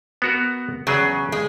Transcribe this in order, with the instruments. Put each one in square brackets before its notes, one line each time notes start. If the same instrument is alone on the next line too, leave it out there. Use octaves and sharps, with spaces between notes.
[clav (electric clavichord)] B3 F#4 A#4
[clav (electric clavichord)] E2 F#3 G#4 [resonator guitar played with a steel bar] C#3
[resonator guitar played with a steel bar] G#3